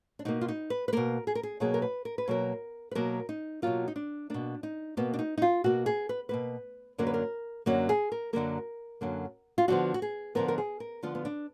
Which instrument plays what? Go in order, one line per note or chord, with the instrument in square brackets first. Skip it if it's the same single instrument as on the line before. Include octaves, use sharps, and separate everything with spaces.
[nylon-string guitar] D4
B2 A#3 D#4
F4
D#4
B4
B4
B2 A#3 A#4
G#4
A#4
G#4
B2 F#3 A#3 G#4
A#4
B4
A#4
B4
B2 F#3 A#3 A#4
B4
B2 F#3 A#3 A#4
D#4
B2 F#3 A#3 F4
D#4
D4
B2 A#3 D4
D#4
B2 A#3 B3
D4
D#4
D#4
F4
B2 A#3 F#4
G#4
B4
B2 A#3 B4
F#2 D3 F#3 A#3 A#4
B4
A#4
F#2 D3 F#3 A#3 F#4
G#4
A#4
F#2 D3 F#3 A#3 A#4
F#2 D3 F#3 A#3
F4
D3 F3 B3 F#4
F#4
G#4
D3 F3 B3 A#4
A#4
G#4
A#4
D3 F3 B3 F4
B3
D4